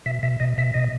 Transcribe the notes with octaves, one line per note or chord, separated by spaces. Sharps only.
B2 E5
B2 E5
B2 D#5
B2 E5
B2 D#5